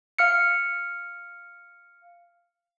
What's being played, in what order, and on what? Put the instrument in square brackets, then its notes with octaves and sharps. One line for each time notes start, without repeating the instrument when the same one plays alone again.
[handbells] F5 F6 C#7